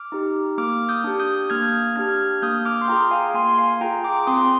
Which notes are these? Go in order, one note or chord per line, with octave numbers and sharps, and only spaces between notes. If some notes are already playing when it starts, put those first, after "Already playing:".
Already playing: D6 F6
D#4 G4
A#3 D6 F6
D#6 G6
D4 G4
D#6 G6
A#3 F6 G#6
D4 G4 F6 G#6
A#3 D#6 G6
D6 F6
C6
F4 G#4 G5 A#5
F5 G#5
A#3 G#5 C6
F5 G#5
F4 G#4 G5 A#5
A#5 D6
C4 C6 D#6